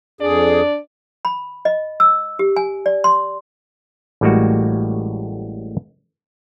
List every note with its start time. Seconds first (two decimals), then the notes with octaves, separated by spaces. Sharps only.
0.21 F2 D4 G#4 D5
1.25 B5
1.65 D#5
2.00 E6
2.39 G4
2.56 G#5
2.86 D5
3.04 C6
4.21 A1 A2 G3 G#3 A#3 F#4